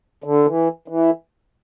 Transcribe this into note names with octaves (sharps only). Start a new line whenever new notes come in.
D3
E3
E3